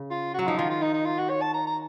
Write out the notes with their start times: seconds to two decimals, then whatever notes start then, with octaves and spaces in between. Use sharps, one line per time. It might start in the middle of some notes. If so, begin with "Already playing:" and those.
Already playing: C#3
0.11 F4
0.34 F#3 F#4
0.47 F3 D#4
0.58 D#3 F4
0.70 F4
0.82 D#4
0.93 D#4
1.05 F4
1.18 F#4
1.29 C#5
1.41 A5
1.54 A#5
1.67 A#5